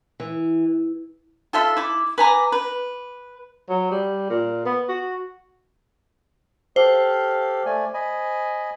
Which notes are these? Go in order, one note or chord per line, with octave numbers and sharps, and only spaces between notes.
E3
F4 A4 E5 C6
E4 D6
B4 G#5 A#5 D6
B4
F#3
G3
A#2
B3
F#4
G4 A4 C5 F5
A3 D5 G#5
D#5 G#5 B5